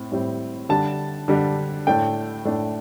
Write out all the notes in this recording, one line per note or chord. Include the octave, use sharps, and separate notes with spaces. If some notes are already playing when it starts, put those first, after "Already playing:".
Already playing: A2 C4
A2 G3 C4
D3 G3 D4 A5
D3 G3 D4
A2 A3 D4 G5
A2 A3 D4